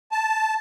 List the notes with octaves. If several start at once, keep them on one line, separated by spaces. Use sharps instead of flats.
A5